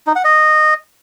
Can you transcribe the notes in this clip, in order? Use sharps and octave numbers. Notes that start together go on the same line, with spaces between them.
D#4
F#5
D#5